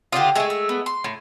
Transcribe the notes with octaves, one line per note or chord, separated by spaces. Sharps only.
D3 D4 F4 G4 D#6
G#3 A3 G#4 E5 C#6
E6
B3
C6
A2